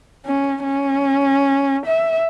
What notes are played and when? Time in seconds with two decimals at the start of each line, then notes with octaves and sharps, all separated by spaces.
0.26 C#4
0.63 C#4
1.87 E5